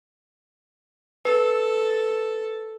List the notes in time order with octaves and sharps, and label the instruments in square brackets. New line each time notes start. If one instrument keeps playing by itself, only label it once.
[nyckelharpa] A4 [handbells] B4